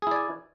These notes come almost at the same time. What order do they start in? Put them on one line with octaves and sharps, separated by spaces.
G#4 E4 D5 G#5